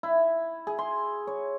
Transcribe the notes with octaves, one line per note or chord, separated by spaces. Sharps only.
E4
G#4
C6
C#5